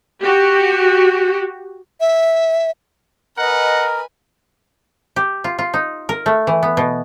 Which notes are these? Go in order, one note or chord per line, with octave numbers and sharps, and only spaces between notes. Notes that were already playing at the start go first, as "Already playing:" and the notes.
F#4 G4
E5
A#4 B4 D#5 F#5 G#5
G4
F4
F4
D#4
A#4
A3
E3
B3
B2